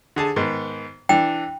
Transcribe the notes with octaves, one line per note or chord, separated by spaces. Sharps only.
D3 G#4 A5
G#2 D#3 B3
E3 D4 G5